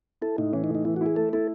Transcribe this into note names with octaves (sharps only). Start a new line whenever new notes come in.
E4 A4
A2 D#4
E3 C#4
D#4
A2
D#4
E3 E4
E4 F#4
G#4
A3 A4
E4 A4